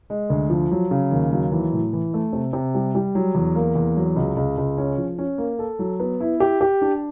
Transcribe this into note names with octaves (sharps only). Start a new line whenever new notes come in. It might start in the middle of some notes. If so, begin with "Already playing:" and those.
G#3
D2
F3
F#3
C#3
D#2
F#3
E3
A2
E3
A3
C3
C3
G3
G3
F#3
E2
A#3
E2
F#3
C#2
C#2
C#2
C#4
F3
C#4
A#3
A4
F#3
B3
E4
G4
G4
D4